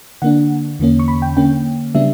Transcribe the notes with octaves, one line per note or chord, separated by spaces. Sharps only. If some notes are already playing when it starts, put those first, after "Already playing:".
D3 A#3 D4 F#5
E2 D3 A#3 C#4
C#6
B5
G5
D3 A#3 C#4 G5
C#3 G3 B3 D4 E5